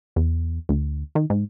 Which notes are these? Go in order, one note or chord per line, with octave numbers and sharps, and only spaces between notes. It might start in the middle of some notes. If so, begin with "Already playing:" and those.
E2
D2
D#3
G#2